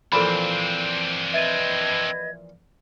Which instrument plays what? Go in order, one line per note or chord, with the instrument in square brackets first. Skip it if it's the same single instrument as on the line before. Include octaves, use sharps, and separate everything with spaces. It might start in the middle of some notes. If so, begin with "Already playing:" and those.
[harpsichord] A#2 E3 F3 [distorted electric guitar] C4 D4 [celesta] A4 B5
[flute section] B4 D#5 G#6 [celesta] E5 A6 D#7